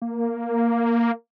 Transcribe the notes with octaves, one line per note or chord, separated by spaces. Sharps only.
A#3